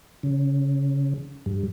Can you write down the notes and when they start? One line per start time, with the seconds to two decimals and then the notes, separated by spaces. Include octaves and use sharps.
0.23 C#3
1.46 G2